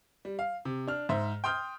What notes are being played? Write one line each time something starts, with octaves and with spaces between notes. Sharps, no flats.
G3
F5
C3
D4 F6
G#2 C5 E5
G5 C6 D#6 F6 G6